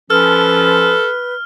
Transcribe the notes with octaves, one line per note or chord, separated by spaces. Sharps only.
F3 C#4 A4 B4 F6